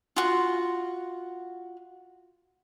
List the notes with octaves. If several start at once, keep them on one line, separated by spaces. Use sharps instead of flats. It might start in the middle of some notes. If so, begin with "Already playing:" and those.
F4 F#4